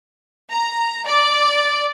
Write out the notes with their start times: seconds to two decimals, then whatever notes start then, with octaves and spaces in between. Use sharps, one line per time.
0.51 A#5
1.07 D5